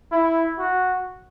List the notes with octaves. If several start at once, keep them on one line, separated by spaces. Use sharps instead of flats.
E4
F#4